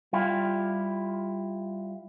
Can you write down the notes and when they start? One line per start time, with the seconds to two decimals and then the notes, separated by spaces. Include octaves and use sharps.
0.13 G3 E4 F4 G4